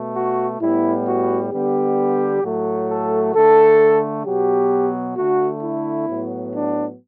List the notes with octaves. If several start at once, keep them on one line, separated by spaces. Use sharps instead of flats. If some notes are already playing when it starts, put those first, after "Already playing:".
Already playing: B2 A3
F#4
A2 G3 B3 E4
F#4
D3 G3 B3 G4
A2 F#3 A3
A4
D3 A3 A4
B2 F#3 B3 G4
D3 A3 F#4
E4
A2 F#3 B3
D4